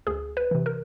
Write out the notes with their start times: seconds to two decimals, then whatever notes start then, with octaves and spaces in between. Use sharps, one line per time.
0.07 D2 G#4
0.37 B4
0.51 C3 E3
0.66 A#4